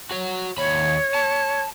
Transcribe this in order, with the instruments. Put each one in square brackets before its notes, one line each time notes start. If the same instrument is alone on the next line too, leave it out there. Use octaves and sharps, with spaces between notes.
[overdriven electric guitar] F#4 C#5
[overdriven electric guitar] D#2 B5 [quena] C#5
[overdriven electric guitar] A5